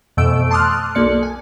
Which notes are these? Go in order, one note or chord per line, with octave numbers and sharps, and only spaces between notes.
F2 B2 E3 A3 E6 D7
A5 C6 D6 D#6 F6 F#6
B1 A#3 D5 C#7
G#5